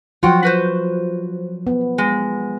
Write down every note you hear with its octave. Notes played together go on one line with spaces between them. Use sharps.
F3 F#3 F4 F#4 G5
F#4 B4 C5
B3
G#3